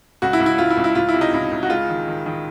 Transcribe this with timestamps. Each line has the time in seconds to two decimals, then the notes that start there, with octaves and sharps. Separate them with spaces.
0.22 C#2 F#4
0.33 E4
0.40 C#2
0.46 E4
0.58 C#2 F4
0.70 E4
0.77 C#2
0.84 E4
0.95 C#2 F4
1.09 E4
1.14 C3
1.21 D#4
1.33 C#2 E4
1.51 C#2
1.63 F#4
1.70 G#3 F4
1.89 D#3
2.08 D#3
2.26 D#3